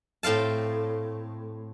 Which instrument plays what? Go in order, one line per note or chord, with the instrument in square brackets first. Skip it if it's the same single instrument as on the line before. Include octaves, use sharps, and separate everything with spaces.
[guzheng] A2 C4 F5 A5